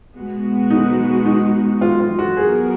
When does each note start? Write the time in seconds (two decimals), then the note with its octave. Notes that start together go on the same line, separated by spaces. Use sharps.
0.15 B2 G#3 B3 F#4
0.70 D#4
1.26 D#4
1.81 F4
2.00 F4
2.19 F#4
2.37 F#3 B3 F#4 G#4 A#4